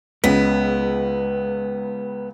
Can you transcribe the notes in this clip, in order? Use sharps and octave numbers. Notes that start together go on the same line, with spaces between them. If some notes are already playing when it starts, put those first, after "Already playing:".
C#2 C#3 G#3 B3 B6